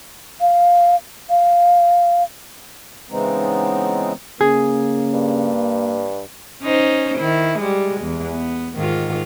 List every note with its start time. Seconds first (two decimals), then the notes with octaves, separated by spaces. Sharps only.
0.41 F5
1.30 F5
3.10 C#3 E3 G#3 B3 C4 D#4
4.41 C#3 A#3 G#4
5.13 G2
6.63 C#4 D#4 C5
7.19 D#3 E4
7.60 G3 G#3
8.01 E2
8.32 B3
8.77 G#2 D#3 F4